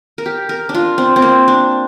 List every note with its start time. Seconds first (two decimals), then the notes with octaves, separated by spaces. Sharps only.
0.18 A#4
0.26 G4
0.49 A#4
0.69 D4
0.75 F4
0.98 C4
1.16 C4
1.22 A#3
1.48 D4